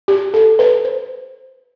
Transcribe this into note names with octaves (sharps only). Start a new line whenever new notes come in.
G4
A4
B4
C5